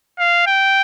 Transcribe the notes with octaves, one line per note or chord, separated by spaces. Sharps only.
F5
G5